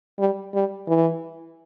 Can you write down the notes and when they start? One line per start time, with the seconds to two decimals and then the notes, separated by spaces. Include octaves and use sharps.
0.19 G3
0.54 G3
0.88 E3